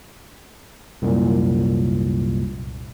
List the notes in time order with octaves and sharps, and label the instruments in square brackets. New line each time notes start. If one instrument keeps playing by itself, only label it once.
[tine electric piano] C2 F#2 A#2